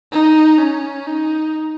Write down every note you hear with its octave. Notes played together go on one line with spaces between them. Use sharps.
D#4
C#4
D#4